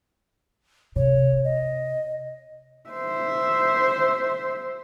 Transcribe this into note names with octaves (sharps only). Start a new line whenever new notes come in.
C3 C#5
D#5
C5 E5